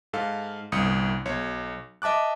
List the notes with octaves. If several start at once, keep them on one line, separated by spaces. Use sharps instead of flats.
G#2 A4 F5
G1 C2 D#6 C#7
B1 C#5
D#5 E5 A5 D6 F#6